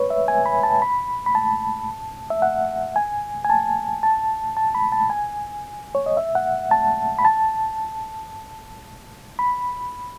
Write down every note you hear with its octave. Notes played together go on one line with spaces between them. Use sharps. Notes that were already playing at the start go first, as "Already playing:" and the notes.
Already playing: B4 C#5
E5
G#5
B5
A5
B5
B5
A5
E5
F#5
G#5
G#5
A5
A5
A5
B5
A5
G#5
C#5
D#5
E5
F#5
A5
B5
A5
B5